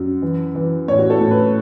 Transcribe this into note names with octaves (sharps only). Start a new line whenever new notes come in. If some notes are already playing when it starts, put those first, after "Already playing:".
Already playing: F#2
E3
E3
A2 C#5
F#4
A4
A2
B4